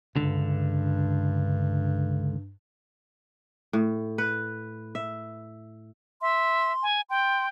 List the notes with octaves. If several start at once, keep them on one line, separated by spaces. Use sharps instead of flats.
C#2 G2 D3
A2
B4
E5
E5 C6
G#5
G5 C6